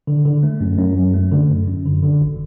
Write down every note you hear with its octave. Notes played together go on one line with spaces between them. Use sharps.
D3
D3
A3
F#2
F#2
F#2
A3
D3
F#2
F#2
D3
D3
G#1